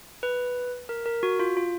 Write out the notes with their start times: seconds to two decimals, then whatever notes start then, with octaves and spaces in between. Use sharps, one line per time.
0.23 B4
0.89 A#4
1.06 A#4
1.23 F#4
1.39 F4
1.57 F4